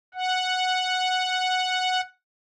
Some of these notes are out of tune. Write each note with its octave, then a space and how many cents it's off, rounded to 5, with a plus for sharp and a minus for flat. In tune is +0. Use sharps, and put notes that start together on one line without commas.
F#5 -5